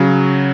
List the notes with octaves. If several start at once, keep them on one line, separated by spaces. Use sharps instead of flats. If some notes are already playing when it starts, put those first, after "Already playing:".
Already playing: C#3 F#3